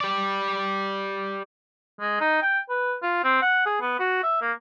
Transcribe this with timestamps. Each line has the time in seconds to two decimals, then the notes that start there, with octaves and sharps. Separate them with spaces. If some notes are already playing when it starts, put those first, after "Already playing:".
0.01 G4 D5
2.00 G#3
2.21 D#4
2.42 G5
2.70 B4
3.02 F4
3.24 C4
3.42 F#5
3.66 G#4
3.81 B3
3.99 F#4
4.23 E5
4.41 A#3